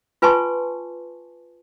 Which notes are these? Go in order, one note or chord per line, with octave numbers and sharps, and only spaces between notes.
F4 B4 G#5 A5 C6 C#6